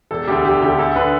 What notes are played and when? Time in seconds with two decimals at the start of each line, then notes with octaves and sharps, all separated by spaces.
0.11 E1 A4
0.27 D2 D3 G4
0.45 E1 G4
0.62 D2 D3 G4
0.78 D2 A4
0.96 D3 B4